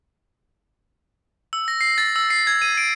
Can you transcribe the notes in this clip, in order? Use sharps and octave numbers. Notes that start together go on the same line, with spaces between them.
E6
A#6
C7
A6
E6
C7
G#6
D#7
D7